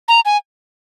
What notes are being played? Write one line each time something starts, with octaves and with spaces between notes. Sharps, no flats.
A#5
G#5